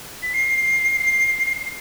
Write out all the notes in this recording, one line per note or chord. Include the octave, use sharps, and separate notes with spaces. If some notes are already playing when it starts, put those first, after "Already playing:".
B6
C7